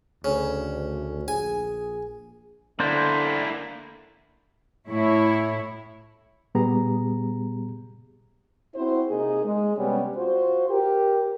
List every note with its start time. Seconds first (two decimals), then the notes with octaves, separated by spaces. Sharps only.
0.24 D2 C#3
1.28 A#1 G#4 G#5
2.80 D3 A#3 D4 E4 C5
4.88 A2 E4 C#5
6.55 A#2 G3 B3 G4 G#4 A#5
8.75 C4 E4 F#4 C5
9.08 C3 A#3 D#4 G#4
9.44 G#3
9.77 C3 G3 B3 C#4
10.16 F4 F#4 C5
10.69 G4 A#4